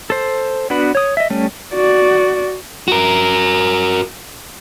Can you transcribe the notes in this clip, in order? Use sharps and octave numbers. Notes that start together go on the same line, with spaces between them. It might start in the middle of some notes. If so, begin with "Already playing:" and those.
A4 C5
B3 D4 F#4 B4 B5
C#5 D#6
D#5 E5
G3 A3 C#4
F#4 D5
F#4 A#4